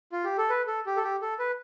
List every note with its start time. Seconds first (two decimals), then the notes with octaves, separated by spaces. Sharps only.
0.12 F4
0.24 G4
0.38 A4
0.50 B4
0.67 A4
0.86 G4
0.97 A4
1.04 G4
1.21 A4
1.39 B4